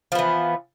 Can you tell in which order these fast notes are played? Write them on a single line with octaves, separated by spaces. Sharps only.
F3 B3 E3